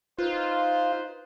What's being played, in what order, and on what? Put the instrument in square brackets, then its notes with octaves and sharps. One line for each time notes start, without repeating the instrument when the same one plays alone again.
[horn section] D#4 B4 C5 [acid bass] F4